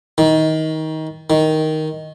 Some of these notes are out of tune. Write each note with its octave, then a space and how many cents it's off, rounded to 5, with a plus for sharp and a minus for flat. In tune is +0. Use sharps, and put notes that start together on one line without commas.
D#3 +20
D#3 +5